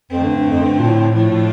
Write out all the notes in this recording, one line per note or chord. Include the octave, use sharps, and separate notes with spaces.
F2 D3 A3 C4
G2
G2
F2
G2
A#2
A2
A2 F3 A3 D4 F4
A2